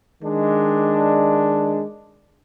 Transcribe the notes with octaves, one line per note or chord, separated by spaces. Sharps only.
D#3 G#3 D4